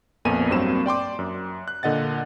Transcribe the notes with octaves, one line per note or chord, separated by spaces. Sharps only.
A#1 F2 A#3 B3 G#5 D#7
G2 F#3 A#3 C4 E7
D5 G5 C6 D6
F#2
F#6
A#2 D3 D#5 F#5 A6